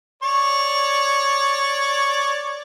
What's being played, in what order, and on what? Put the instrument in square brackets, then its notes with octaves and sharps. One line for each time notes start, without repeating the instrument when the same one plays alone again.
[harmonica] C#5 D5